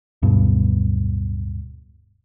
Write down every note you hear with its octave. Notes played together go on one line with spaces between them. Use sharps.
D1 G2 B2